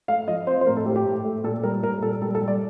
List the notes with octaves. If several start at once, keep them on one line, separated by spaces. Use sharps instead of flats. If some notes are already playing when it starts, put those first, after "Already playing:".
A3 F5
F3 D#5
C4 C5
C5
A2 A#4
A4
A2 G4
G4
A2
A3
A#2 A4
G3 A#4
A#2 A#4
A#2 A4
G3 A4
A4
G3
D5